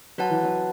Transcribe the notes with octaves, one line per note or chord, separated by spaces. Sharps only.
F#3 F#4 B4 F#5 A5
E3
F#3